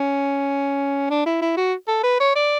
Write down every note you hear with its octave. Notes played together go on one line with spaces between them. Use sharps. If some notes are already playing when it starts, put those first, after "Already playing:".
Already playing: C#4
D4
E4
E4
F#4
A4
B4
C#5
D5